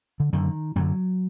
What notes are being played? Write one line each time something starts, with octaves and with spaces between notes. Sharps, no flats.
D3
F#2 D3 D#3
F#2 D3 F#3